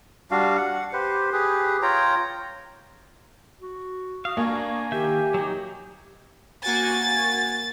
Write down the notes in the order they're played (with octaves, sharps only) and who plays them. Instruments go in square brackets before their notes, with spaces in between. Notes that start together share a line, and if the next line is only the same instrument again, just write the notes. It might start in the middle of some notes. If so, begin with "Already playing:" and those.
[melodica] G3 D4 F#4 F5
F#5
G4 B4 C5
G4 G#4 B4
F4 C#5 G5 A#5
[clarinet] F#4
[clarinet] F#4 [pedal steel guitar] F5 [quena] D#6
[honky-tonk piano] A#3 [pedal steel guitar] D4 [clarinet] G#5 [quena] C#6
[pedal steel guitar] D#3 E5 G6 [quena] G4
[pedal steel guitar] F#3 D#4
[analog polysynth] A#3 F#4 G#5 [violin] A6